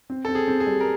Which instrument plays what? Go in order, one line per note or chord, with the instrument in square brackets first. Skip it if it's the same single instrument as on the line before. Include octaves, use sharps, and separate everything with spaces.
[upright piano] C4
[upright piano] C4 [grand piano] A4
[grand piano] G#4
[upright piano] C4
[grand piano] G#4
[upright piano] G3
[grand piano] A#4